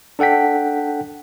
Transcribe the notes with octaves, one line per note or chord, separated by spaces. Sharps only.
D4 A4 F#5 G5 B6